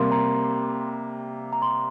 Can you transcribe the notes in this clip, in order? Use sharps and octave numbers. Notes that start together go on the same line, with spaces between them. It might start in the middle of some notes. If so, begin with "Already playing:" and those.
Already playing: C3 G3 A#3 C6
A#5
A#5
C6